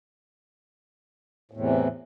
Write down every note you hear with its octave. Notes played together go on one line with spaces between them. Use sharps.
E2 A2 C3 E3